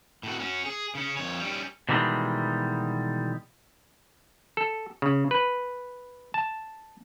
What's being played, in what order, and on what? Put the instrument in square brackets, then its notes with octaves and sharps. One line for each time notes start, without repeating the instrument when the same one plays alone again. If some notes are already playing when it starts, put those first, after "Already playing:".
[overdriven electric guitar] A2 F#4
C#4 F#4
G#4
C#3 C#4
F2 C#5
G3 C#4
[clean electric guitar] B2 D#3 E3 G3 G#3
[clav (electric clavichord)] A4
C#3
B4
A5